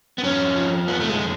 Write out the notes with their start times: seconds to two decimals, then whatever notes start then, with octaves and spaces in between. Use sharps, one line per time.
0.18 B3
0.23 F2 C#4
0.56 F3
0.88 F2 B3
1.00 A3
1.09 G#3
1.20 D3